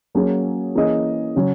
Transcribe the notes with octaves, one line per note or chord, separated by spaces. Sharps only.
F#3 A#3 C#4 G#4
E3 A#3 C#4 G#4 D#5
C#3 F#3 C#4